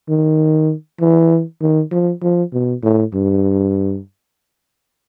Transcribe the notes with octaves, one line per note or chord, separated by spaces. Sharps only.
D#3
E3
D#3
F3
F3
B2
A2
G2